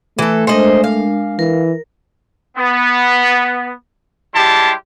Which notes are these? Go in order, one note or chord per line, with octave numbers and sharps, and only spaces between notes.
E3 A3 A4
G#3 D4 A#4 C5 D#5
F5
E3 A#4
B3
G3 G#3 E4 G4 A5 C6